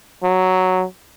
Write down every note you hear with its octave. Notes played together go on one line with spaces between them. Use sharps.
F#3